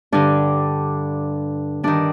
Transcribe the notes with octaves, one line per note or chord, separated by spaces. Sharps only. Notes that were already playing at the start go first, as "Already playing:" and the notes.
G2 D3 D4
G2 D#3 D4